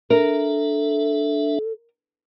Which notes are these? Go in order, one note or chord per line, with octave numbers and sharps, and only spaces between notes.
D4 A4 A#4 E5